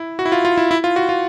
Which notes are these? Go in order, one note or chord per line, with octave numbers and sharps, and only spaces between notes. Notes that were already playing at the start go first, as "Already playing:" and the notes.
Already playing: E4
F#4
E4
F4
F4
E4
E4
F4
F#4
F4